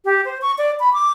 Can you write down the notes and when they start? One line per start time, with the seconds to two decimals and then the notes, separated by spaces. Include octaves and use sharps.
0.05 G4
0.25 C5
0.42 C#6
0.58 D5
0.80 B5
0.93 D6